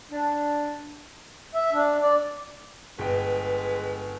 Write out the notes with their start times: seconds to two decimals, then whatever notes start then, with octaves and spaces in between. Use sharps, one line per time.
0.10 D4
1.55 E5
1.73 D4
2.02 D5
2.99 G1 G#3 B4 G5